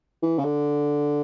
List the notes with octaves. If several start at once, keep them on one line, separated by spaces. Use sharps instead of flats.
E3
C#3
D3